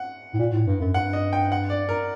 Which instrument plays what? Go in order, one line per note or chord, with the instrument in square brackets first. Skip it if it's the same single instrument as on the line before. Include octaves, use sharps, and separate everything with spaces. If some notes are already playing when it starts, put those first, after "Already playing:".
Already playing: [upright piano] F#5
[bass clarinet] A2
A#2
A2
G2
F#2
[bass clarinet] G2 [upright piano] F#5
[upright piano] D#5
G5
F#5
D5
A#4